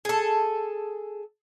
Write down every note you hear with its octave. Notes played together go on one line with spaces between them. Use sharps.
G#4 A4